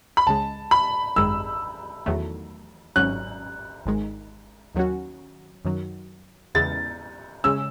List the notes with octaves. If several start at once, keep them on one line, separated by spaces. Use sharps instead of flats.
B5
C#2 C#3 G#3 A5
B5
G#1 F#2 D#3 G#3 E6
E2 D#3 F#3 A3
G#1 G#2 F#3 C#4 F#6
G#1 G#2 D#3 G#3
D#2 D#3 F#3 C#4 F#4
F#2 D#3 F#3
E2 C#3 G#3 B3 E4 A6
C#3 G#3 C#4 E6